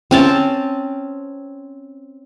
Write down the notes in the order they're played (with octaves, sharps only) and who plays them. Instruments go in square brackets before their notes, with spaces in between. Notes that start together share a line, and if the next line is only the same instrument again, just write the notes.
[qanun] C4 C#4 A5